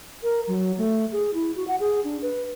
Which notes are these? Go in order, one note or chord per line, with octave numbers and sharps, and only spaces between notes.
A#4
F#3
A3
G#4
E4
F#4
F#5
G#4
D4
B4